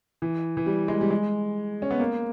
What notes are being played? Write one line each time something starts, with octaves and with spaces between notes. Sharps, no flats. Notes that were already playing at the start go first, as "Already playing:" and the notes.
E3
E3
G3
G#3
G3
G#3
C#4
B3
A#3